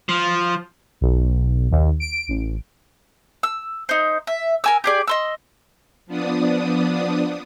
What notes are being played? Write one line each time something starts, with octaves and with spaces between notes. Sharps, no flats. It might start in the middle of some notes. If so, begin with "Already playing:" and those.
F3
B1
D#2
D7
A1
E6
D#4 C5
E5
A#4 G#5 E6
G4 G#4 D5
D#5 C6 E6
F3 B3 D4 D5 D#6